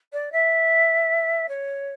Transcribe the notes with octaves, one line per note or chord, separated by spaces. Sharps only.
D5
E5
C#5